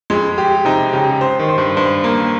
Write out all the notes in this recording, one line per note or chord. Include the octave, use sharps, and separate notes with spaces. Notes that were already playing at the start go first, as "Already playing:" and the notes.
F2 G#3
G4
C3 D#4
C#3 G4
C5
D#3
C5
G2
G2 C5
A#3